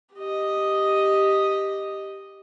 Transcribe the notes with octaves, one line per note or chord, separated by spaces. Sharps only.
G4 D#5